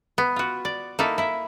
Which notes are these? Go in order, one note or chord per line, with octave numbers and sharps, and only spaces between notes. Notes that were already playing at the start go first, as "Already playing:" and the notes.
B3
F4 F#4
D5
A#3 D#4 E4 A4
E4 E5